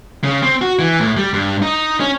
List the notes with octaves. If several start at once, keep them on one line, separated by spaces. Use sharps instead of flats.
C#3
C4
F#4
E3
A2
G3
G2
D#4
C#4